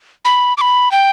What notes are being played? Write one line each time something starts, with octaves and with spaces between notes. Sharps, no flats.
B5
D6
B5
G5